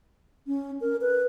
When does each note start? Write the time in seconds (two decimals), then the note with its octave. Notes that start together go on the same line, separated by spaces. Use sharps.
0.47 C#4
0.81 A#4
1.01 B4